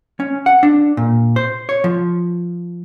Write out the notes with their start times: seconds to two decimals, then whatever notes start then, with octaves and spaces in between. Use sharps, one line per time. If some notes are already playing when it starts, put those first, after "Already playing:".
0.20 C#4
0.46 F#5
0.63 D4
0.97 A#2
1.36 C5
1.69 C#5
1.84 F3